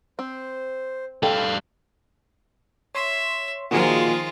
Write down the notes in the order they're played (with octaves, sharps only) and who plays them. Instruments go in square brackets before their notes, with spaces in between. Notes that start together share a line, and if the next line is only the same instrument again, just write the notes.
[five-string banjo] C4 [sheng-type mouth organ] C5
[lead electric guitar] G3 F5 [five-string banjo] A4 [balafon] G5
[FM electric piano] C#5 C6 [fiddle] E5
[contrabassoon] A#2 [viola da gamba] D#3 F3 [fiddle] G#3 F4 [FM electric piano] F#4 G#4 A#4